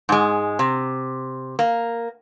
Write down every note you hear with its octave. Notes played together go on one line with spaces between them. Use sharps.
G#2 G#3
C3
A#3